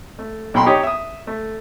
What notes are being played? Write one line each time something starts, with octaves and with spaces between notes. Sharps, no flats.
A3
B1 A#2 G5 B5 C6
D#4 G4 C#5 D#6
E5 D#6
A3